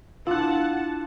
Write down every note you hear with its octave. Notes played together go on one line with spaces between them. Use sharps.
D4 E4 F4 F#5 A5 F#6